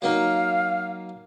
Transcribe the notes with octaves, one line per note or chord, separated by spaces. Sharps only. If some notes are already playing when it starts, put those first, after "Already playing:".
F#3 A#3 D#4 F5